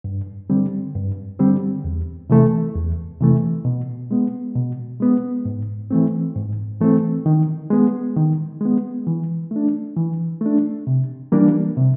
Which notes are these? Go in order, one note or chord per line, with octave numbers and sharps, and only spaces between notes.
G2
D3 G3 C4
G2
D3 G3 C4
E2
C3 E3 A3
E2
C3 E3 A3
B2
G#3 B3
B2
G#3 B3
G#2
E3 A3 C4
G#2
E3 A3 C4
D#3
G#3 B3
D#3
G#3 B3
E3
A3 D4
E3
A3 D4
C3
E3 G3 A#3 D4
C3